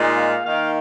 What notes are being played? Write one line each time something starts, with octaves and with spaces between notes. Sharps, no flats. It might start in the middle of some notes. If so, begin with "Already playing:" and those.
Already playing: A#2 G#3 D#4
F5
D#3 A#3 D#4 F5